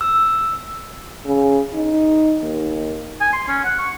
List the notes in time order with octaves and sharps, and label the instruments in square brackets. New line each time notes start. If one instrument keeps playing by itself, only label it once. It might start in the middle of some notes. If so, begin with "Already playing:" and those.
[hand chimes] E6
[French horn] C#3
D#4
D#2
[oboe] G#5
C6
C#4
F#5
C#6